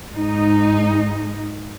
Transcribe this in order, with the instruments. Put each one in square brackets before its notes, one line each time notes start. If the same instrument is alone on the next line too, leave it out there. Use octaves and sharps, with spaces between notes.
[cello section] G#2 D#4